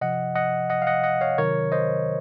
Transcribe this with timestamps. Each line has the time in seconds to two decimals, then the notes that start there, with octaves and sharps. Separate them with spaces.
0.01 C3 F3 D#5 F#5
0.35 D#5 F#5
0.70 D#5 F#5
0.82 F5
0.87 D#5 F#5
1.04 D#5 F#5
1.21 C#5 F5
1.38 C3 D#3 F#3 A#4 C#5
1.72 C5 D#5